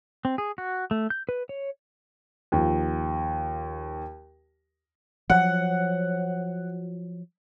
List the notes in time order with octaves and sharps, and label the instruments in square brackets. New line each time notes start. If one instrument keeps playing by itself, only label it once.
[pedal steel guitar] C4
G#4
F#4
A3
G6
B4
C#5
[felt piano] D#2 F3
[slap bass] F3 F#3 [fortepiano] F#5